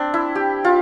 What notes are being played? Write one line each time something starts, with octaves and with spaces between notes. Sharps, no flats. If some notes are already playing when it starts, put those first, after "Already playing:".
Already playing: C4 D4
E4
G4
F4